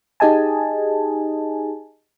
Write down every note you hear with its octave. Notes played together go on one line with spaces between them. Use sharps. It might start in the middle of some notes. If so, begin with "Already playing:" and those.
D#4 G4 G#4 D#5 G#5 A5